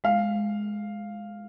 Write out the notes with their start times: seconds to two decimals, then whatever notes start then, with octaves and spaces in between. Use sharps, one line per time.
0.04 G#3 F5
0.36 G#3